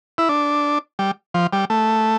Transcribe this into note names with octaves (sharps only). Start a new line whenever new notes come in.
E4
D4
G3
F3
G3
A3